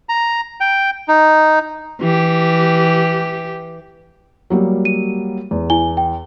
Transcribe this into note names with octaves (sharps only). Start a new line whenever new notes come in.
A#5
G5
D#4
E3 G4
F#3 G3 A#3
D#7
E2
E4 G#5 G7
G5